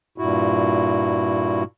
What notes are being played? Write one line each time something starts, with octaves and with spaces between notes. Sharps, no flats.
G2 A#2 E4 F#4